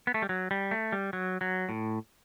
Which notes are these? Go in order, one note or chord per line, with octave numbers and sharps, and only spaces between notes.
B3
A3
G3
F#3
G3
A3
G3
F#3
F#3
A2